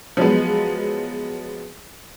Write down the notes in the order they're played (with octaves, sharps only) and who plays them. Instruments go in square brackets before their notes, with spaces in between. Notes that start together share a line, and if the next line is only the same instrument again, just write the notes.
[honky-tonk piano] F3 F#3 G#3 B3